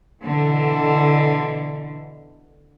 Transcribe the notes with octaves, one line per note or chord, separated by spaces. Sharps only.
B2 D3 E3